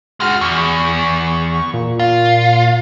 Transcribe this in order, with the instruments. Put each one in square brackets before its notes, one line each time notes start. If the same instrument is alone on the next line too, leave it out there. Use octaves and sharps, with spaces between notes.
[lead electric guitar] G#3 F#4 [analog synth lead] F6
[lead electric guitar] E2 [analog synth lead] C#6
[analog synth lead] A#2
[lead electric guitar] F4